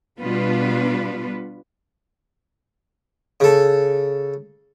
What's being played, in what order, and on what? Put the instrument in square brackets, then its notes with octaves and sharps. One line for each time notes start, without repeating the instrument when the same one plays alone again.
[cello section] B2 G3 B3 D4 F4 B4
[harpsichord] C#3 A4